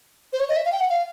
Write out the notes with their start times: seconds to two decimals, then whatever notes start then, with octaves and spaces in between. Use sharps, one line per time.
0.33 C5
0.40 C#5
0.49 D#5
0.56 E5
0.65 F5
0.72 G5
0.80 F#5
0.90 F5